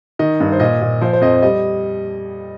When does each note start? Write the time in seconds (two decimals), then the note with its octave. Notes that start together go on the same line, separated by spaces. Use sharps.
0.19 D#3 D#5
0.40 G2
0.52 C5
0.60 A#2 D#5
0.81 A#2
1.01 F3 C5
1.13 C5
1.21 F2 D#5
1.42 G3 D#5